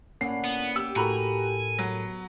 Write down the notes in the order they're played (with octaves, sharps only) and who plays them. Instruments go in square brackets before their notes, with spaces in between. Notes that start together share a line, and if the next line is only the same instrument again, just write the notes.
[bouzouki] A2 D3 F#5 [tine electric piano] A#3 C#4 [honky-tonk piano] C7
[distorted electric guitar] B3
[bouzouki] G4 [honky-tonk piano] E6
[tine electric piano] A2 A4 A#4 [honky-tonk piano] F#4 A#5 B5 [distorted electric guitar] G#5
[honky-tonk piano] F#3 [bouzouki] B3